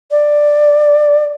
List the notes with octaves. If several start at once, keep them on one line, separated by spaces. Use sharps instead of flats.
D5